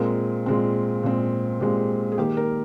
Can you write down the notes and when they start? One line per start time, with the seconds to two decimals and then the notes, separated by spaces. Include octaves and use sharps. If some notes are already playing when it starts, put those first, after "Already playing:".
Already playing: A#2 G#3 C4 A#4
0.46 A#2 G#3 C4
1.03 A#2 G#3 C4
1.60 A#2 G#3 C4 G4
2.12 G#4
2.18 D#3 A#3 G4
2.37 A#4